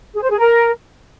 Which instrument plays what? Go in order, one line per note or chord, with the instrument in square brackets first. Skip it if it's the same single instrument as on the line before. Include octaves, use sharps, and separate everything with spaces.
[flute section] G#4
C5
G#4
A#4